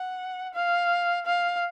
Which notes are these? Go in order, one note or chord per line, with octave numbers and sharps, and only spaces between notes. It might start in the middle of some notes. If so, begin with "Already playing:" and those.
Already playing: F#5
F5
F5